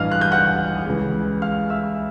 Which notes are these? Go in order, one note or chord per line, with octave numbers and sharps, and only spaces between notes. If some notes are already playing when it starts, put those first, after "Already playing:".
Already playing: A1 G2 E3 D#5 F5 F6
F#6
G6
F#5 F#6
C#2 C#3 E3
F5 F6
E5 E6